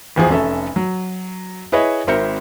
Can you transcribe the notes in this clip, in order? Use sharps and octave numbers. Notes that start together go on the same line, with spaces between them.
A1 E2 F3 G#4 C5
F1 C#4 A4 E5
F#3
E4 G#4 B4 C#5 D#5 E5
G#1 C4 A#4 E5 G6 C#7